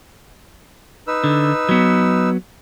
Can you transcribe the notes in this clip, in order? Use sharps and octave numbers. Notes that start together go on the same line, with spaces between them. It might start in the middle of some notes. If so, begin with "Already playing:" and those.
D#4 B4 E6
D3
F#3 B3